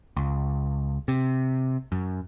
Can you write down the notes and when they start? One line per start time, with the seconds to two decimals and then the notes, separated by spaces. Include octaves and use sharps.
0.17 C#2
1.08 C3
1.92 F#2